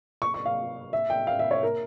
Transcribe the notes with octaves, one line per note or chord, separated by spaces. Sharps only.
C#6
C#6
F5
E5
G5
F5
E5
C#5
A#4